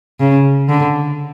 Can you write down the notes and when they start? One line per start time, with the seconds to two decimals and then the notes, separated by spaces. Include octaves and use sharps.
0.20 C#3
0.69 D3